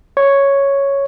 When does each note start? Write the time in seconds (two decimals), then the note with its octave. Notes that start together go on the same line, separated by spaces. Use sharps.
0.17 C#5